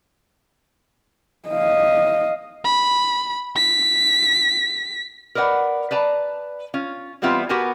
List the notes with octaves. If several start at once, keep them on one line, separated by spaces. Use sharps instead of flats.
D#5 F5
B5
B6
A#4 B4 D5 D#5 F#5
B4 D5 A5 A#5
C#4 F4
E3 G3 B3 C4 F4 E5
B3 F#4 G4 A#4 G#5